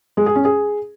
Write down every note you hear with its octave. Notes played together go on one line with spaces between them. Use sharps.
G#3
G#4
C#4
G#4